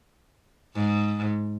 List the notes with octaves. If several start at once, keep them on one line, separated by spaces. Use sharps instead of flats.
G#2